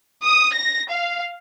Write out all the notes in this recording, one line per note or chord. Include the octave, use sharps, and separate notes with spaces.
D#6
A#6
F5